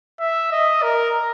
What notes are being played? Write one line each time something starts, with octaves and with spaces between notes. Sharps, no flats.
E5
D#5
A#4